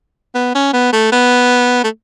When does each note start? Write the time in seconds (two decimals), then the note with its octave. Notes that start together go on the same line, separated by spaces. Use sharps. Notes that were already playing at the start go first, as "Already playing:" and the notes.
0.35 B3
0.55 C#4
0.73 B3
0.92 A3
1.12 B3
1.84 A3